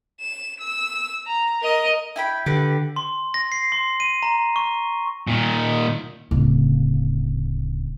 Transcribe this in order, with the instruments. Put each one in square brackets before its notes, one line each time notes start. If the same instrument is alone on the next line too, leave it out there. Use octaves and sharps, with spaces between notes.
[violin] E7
E6
A#5
A#4 D#5
[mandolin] E4 G5 B5
[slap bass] D3 [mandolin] G4 B4
[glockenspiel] C6
A#6
C7
C6
D#7
A#5
C#6
[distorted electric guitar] A#2 D#3
[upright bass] D1 C#3